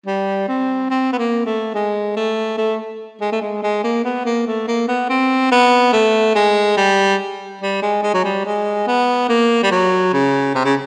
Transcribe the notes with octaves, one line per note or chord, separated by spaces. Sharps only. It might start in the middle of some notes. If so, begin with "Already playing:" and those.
G3
C4
C4
B3
A#3
A3
G#3
A3
A3
G#3
A3
G#3
G#3
A#3
B3
A#3
A3
A#3
B3
C4
B3
A3
G#3
G3
G3
G#3
G#3
F#3
G3
G#3
B3
A#3
G3
F#3
C#3
C3
C#3